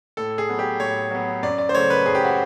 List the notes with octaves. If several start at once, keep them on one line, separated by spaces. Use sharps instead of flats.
A2 A4
G#4
F#3 B3
G4
A2 C#5
F#3 B3
F#2 D5
D5
C5
C#3 F#3 A3 C#5
B4
F#2 G#4
G4
F#4